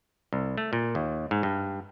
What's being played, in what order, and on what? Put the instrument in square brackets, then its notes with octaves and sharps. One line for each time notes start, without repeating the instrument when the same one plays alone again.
[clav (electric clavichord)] C2
A3
A#2
D#2
G#2
G2